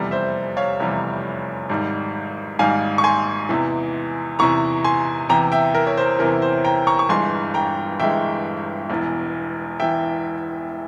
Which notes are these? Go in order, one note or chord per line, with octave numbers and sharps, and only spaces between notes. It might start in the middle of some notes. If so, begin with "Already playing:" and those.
Already playing: F1 E2 C3 G3
C5 E5
C#5 F5
F1 E2 C3 G3
G#1 G#2 G3
G#1 G#2 G3 F5 G#5
C#6
G#5 C6
E2 C3 E3
E2 C3 E3 A#5 C#6
G#5 C6
E2 C3 E3 G5 A#5
E5 G5
A#4
C#5
C5
E2 C3 E3 A#4
C5
G5 A#5
A#5 C#6
C#6
G1 G2 E3 G#3 G#5 C6
G5 A#5
G1 G2 E3 G#3 E5 G5
E1 E2 E3
E3 E5 G5